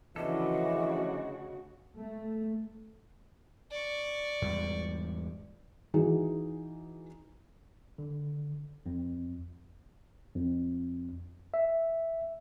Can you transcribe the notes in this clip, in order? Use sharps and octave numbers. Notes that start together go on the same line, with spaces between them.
D2 C#3 E3 F3 D4 F#4 A4 D#5
A3
D5 C#6
E2 G#2 G3
E3 D#4 F#4 G#4
D3
F2
F2
E5